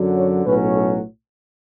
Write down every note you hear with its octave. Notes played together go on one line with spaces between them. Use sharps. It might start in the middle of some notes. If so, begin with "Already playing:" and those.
Already playing: F#2 D3 F#3
C#5
B1 A2 F#3 C#4 B4
A4